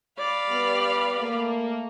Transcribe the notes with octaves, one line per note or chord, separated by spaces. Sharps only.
D5 F5 B5
G3 B3
A3 A#3